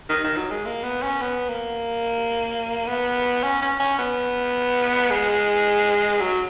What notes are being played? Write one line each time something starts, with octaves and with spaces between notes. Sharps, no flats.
D#3
D#3
F#3
G#3
A#3
B3
C#4
B3
A#3
B3
C#4
C#4
C#4
B3
G#3
F#3